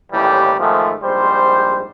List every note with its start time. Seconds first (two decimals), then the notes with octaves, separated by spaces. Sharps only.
0.12 A1 D#2 A2 E3 G3 G4
0.59 G#2 D#3 F3 G#3 A3
1.03 A#1 G#2 G3 C5